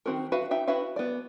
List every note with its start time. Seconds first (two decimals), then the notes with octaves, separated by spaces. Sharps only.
0.06 D#3 E3 C4 F#4 A#4
0.32 F#4 B4 E5 F5
0.51 D#4 E5 G5
0.67 E4 F#4 B4 E5 F5
0.96 B3 D5